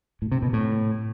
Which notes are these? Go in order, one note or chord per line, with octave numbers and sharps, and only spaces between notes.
A2
C3
B2
A2